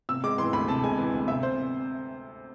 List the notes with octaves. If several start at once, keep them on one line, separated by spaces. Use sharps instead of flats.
C3 E6
G#3 D6
E3 C6
D2 B5
C3 A5
G#3 G#5
E3
D2
C3 E5
C5